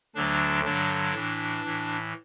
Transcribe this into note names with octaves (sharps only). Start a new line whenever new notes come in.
D2 D3 F#3 D4
G2 D3 F#3 D4
A2 E3
A2 E3